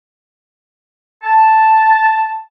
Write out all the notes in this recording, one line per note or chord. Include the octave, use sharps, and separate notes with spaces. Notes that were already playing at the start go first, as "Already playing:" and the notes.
A5